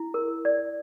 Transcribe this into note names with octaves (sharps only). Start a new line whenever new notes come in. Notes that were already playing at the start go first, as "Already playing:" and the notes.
Already playing: E4
A#4
D5